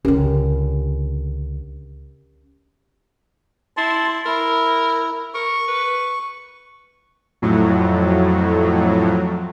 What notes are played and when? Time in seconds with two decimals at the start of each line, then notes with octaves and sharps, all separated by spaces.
0.05 C#2 D3 C#4 G4 A#4
3.77 E4 A5 C6
4.26 E4 A#4
5.34 A#4 C#6
5.68 B4
7.42 F2 A2 F#3